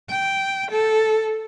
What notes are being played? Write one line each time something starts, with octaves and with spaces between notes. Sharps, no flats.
G5
A4